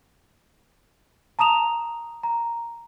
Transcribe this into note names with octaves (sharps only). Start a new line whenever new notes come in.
A5 A#5 D#6 E7 F7
A#5